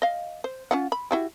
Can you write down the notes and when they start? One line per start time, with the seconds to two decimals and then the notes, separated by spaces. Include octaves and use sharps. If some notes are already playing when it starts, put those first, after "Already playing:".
0.02 D#5 F5
0.44 C5
0.71 C#4 F4 F#5
0.92 B5
1.11 E4 F#4 G4